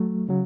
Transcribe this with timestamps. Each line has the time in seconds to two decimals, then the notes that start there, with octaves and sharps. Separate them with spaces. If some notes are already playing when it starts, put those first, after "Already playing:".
Already playing: F#3 A3
0.29 C#3 F#3